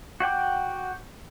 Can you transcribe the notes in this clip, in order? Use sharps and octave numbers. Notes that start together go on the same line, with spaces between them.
F#4 F#5 G5 D6